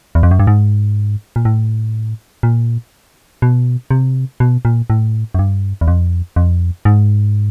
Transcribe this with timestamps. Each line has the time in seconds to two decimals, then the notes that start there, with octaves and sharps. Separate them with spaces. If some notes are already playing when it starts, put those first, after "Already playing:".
0.15 E2
0.23 F2
0.31 F#2
0.40 G2
0.47 G#2
1.36 A#2
1.45 A2
2.43 A#2
3.42 B2
3.91 C3
4.40 B2
4.65 A#2
4.90 A2
5.35 F#2
5.39 G2
5.81 E2
5.88 F2
6.36 F2
6.85 G#2